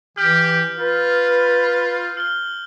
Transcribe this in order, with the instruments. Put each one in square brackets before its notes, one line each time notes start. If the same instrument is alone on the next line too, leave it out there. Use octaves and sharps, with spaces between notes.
[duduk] E3 [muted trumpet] G4 [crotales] F6 G6
[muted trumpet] F4 [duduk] B4
[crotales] F6 G7